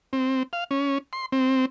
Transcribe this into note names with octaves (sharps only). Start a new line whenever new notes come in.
C4
F5
C#4
C6
C4